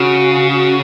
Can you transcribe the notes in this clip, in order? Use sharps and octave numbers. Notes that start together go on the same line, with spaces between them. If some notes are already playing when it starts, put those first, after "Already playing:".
Already playing: C#3 F#4
F#4